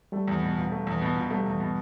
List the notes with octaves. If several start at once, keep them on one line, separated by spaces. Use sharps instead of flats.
G3 A3
E2
B2
E1
A3
E2
B2
E1
G3 A3
E2
B2